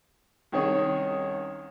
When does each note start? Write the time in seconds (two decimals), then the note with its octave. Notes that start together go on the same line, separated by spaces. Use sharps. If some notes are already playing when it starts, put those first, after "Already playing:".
0.52 C2 D#3 C#4 G#4